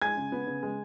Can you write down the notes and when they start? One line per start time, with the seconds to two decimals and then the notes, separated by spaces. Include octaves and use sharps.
0.02 G#3 G#5 G#6
0.17 C#3
0.32 B3
0.47 C#3
0.63 G#3